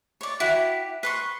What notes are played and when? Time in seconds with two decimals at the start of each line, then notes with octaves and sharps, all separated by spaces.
0.21 C#5 D5
0.40 E4 F#4 G4
1.03 B4 C6 C#6